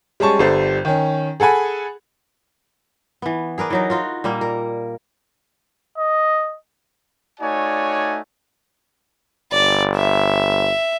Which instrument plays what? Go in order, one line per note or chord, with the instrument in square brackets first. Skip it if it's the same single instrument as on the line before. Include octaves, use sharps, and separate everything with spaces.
[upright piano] G3 G#3 C#4 A5 C#6
G1 G3 A4 C5
D#3 C#4
G#4 A4 F#5 G#5 B5
[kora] E3 B3
G#4 A#4 B4 D5
E3 F#3 D#4
D#4 F4 F#4
A#2 G3 A#3
A#4
[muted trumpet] D#5
[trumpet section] A3 D#4 F#4 C#5 D5 G#5
[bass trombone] G1 [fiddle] D5
[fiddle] E5